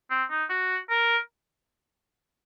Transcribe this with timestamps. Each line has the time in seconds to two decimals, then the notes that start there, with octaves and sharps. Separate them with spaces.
0.10 C4
0.30 D#4
0.50 F#4
0.90 A#4